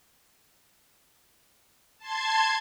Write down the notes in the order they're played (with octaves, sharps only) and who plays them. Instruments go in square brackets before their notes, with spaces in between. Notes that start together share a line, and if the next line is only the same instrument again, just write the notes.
[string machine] A5 C6 G#6